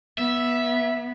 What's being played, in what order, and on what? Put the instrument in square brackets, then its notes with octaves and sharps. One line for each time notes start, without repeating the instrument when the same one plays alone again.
[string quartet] B3 [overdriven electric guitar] E5